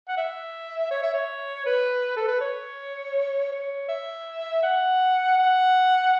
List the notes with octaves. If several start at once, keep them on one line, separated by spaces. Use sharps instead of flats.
F#5
E5
C#5
E5
C#5
B4
A4
B4
C#5
C#5
E5
F#5
F#5